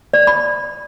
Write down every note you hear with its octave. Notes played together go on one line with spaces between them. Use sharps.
D5
B5